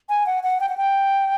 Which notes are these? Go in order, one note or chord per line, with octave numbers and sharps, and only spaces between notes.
G#5
F#5
F#5
G5
F#5
G5